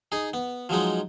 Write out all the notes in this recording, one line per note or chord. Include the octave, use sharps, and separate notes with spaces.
D#4 G#4
B3
F3 F#3 G#3 D#4